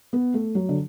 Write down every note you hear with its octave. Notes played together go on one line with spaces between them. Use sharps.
B3
A3
F#3
D3